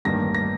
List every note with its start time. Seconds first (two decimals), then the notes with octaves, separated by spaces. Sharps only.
0.05 A1 G2 D#3 A#3 A#6
0.35 A#6